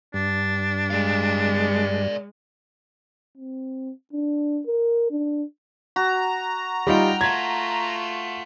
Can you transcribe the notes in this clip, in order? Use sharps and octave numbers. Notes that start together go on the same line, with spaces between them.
G2 D4
G#3 D5 F5
C4
D4
A#4
D4
F#4 A#5
G3 D#4 F4 G5 F6
A3 F4 G#6